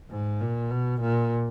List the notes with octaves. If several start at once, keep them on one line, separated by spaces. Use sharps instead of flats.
G#2
A#2
B2
A#2